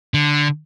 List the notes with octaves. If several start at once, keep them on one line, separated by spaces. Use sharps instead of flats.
D3